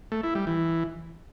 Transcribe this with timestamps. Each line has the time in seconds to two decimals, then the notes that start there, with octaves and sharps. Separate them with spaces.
0.12 A3
0.23 E4
0.35 G3
0.47 E3